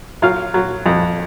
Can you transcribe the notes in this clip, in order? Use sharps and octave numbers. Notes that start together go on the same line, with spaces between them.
F#3 F4 F5
F#3
F2